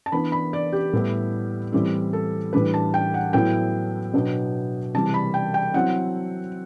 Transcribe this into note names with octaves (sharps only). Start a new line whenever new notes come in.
A5
E3 B3 D4 B5
B5
D5
G4
A2 G3 B3 E4
A2 E3 G3 C4 E4
A4
A2 E3 G3 D4 B4
A5
G5
F#5
A2 F#3 B3 E4 G5
B2 F#3 B3 D4
C3 E3 G3 A5
B5
G5
G5
F#3 C4 E4 F#5